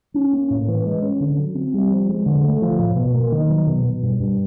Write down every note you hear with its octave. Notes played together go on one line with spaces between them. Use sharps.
C#4
A#3
A2
E3
G#3
C#4
D3
F#3
C4
G3
F3
G#3
D3
A3
F3
A2
B2
A#3
D#3
F#3
B2
B2
G2
G2